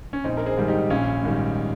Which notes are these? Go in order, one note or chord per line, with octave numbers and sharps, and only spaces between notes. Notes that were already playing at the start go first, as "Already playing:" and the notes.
C#4
A#1 C4 D#4
A#4
G#4 C5
G#2 D#3 G3
D#4 G4
A#1 C#4 F4
G#2 D#3 G3